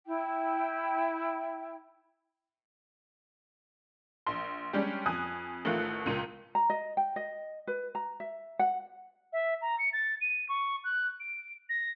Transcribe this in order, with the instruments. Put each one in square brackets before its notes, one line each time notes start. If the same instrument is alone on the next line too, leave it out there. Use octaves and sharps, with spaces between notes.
[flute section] E4 G5
[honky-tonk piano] A#1 C6
G3 G#3 C#4 D4 G4
F2 G#5 D#6 F#6
A1 D#3 A3 F4 F#6
C#2 A#2 D#7
[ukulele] A#5
D#5
G5
D#5
B4
A#5
E5
F#5
[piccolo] E5
A#5
C#7
A6
D#7
C#6
F#6
D7
A#6